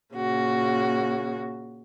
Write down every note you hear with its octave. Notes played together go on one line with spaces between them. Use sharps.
A#2 C#3 F#4